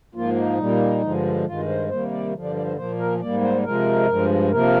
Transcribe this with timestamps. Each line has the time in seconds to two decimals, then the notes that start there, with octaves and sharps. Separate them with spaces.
0.15 G#2 F3 A#3 F4
0.36 D#4
0.58 A#2 G3 A#3
1.01 G2 D3 F3 G#3
1.46 G2 D#3 G#3 F4
1.68 C5
1.89 C3 D#3 G3 A#3 C5
2.11 D5
2.34 G2 D3 F3
2.44 D5
2.55 D5
2.65 C5
2.76 A#2 F3 A#3 C5
2.98 A#4
3.20 G#2 G3 A#3 D5
3.42 C5
3.64 C3 F3 G#3 A#4
4.08 G2 F3 G#3
4.51 C3 F3 A#3 A#4